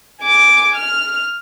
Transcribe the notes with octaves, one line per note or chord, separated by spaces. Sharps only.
G#5 D6
F6